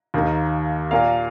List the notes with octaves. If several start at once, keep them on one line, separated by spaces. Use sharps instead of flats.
D#2 D#3 A#3
A#2 A#3 F5